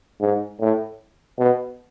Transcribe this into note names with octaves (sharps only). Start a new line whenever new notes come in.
G#2
A2
B2